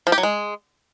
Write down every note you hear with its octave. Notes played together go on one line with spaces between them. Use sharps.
F3
G4
F#3
G#3